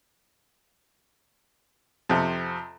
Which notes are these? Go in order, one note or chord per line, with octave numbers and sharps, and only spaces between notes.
F2 C3